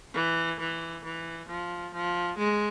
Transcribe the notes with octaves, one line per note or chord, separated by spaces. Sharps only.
E3
E3
E3
F3
F3
G#3